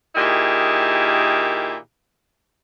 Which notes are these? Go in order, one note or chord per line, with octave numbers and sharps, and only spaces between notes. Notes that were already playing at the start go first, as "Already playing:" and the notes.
A#2 D#3 E4 G4 G#4